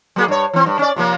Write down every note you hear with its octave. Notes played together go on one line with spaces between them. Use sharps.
F#3 A#3 G#4
G2 C#5
E3 C4
G2
C#4 D5
C3 F3 A#3